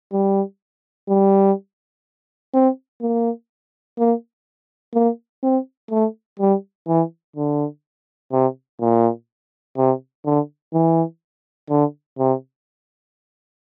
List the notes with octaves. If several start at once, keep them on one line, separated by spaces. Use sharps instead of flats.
G3
G3
C4
A#3
A#3
A#3
C4
A3
G3
E3
D3
C3
A#2
C3
D3
E3
D3
C3